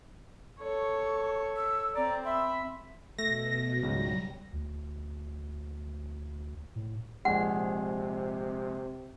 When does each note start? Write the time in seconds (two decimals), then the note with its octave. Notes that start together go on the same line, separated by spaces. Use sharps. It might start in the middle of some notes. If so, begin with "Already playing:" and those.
0.59 A4 C#5 C#6
1.57 E6
1.95 C4 D5 A#5
2.24 E5 B5 C6
3.18 B2 A3 A#6
3.82 C#2 G#2 F#3 G3
4.53 D2
6.76 A2
7.25 A#1 C3 G#3 F#5